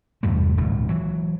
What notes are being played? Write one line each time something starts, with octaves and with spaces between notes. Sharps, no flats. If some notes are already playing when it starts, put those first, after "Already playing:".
E2 G2 C3 A3
D#1 C#2 G#2
E3 F#3